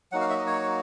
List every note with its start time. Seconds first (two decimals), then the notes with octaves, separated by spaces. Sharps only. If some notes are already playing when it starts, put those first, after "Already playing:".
0.12 F#3 A#3 D#4 F#4 F#5
0.21 F5
0.29 E5
0.38 D#5
0.47 C#5